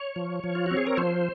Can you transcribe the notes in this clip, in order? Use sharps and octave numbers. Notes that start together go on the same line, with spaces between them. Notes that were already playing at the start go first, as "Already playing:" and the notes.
Already playing: C#5
F3
F3
F4
C4 F#4
G#4
A#4
F3 C5